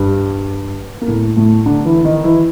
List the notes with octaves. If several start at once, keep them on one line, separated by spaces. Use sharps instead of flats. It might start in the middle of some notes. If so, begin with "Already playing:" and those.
Already playing: G2 G3
A#3
A2 A3
A2 A3
D3 D4
E3 E4
D#3 D#4
E3 E4